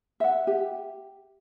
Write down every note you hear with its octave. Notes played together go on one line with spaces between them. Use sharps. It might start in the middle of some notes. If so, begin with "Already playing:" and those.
E5 F#5
G4